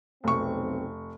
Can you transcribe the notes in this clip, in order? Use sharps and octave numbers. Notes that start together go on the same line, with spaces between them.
F1 B1 C4 C#6